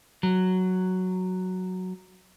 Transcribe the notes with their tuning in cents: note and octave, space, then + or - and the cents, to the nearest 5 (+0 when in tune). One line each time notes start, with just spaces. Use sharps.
F#3 +0